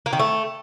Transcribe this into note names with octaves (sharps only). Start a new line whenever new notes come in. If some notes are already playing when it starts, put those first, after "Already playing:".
A#3
D#3
A3